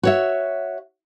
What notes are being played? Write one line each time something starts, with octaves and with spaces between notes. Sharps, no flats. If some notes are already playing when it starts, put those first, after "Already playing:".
F#4 C#5 E5